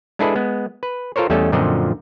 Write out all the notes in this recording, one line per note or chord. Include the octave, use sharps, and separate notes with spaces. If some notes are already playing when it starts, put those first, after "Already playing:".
G#3 D4 E4 G#4 A4 B4
G#3 B3
B4
F4 A4 A#4 C5 C#5
E2 G3 A3 C#4 A4 D#5
F#2 A#2 D3 F3 C4 D#5